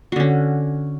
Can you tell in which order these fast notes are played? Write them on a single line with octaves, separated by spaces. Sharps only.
F#4 D3 C#4